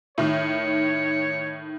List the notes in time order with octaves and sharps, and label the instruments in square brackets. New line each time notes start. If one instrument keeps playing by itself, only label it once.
[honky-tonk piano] A2 D#3 [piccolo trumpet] C#5